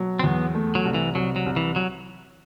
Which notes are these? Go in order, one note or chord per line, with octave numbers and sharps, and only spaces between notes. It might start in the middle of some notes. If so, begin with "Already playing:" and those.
Already playing: B2 F#3
C4
E2 B3
A3
F#3
C2
E3
C2 F#3
F#3
C2
E3
F#3